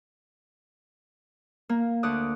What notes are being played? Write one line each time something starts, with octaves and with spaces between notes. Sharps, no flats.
A#3
D2 D5 D#6 F#6